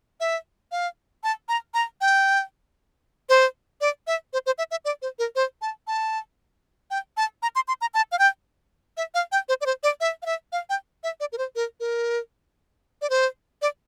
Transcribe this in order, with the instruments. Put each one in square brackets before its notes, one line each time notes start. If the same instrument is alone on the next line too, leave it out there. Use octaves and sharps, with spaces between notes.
[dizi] E5
F5
A5
A#5
A#5
G5
C5
D5
E5
C5
C5
E5
E5
D5
C5
A#4
C5
A5
A5
G5
A5
A#5
C6
C6
A#5
A5
F5
G5
E5
F5
G5
C5
D5
C5
D5
E5
F5
E5
F5
G5
E5
D5
A#4
C5
A#4
A#4
D5
C5
D5